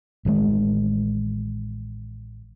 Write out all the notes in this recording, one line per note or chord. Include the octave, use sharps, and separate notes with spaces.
A1 D#3 F#3 G#3